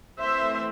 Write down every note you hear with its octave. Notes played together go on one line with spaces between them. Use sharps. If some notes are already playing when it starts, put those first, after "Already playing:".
E3 A3 C4 C5 E5